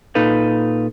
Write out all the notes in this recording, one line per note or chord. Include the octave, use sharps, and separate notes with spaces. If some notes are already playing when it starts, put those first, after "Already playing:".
A#2 D#4 A4 B4 F5